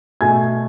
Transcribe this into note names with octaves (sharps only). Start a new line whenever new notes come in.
B2 A3 G#5 G#6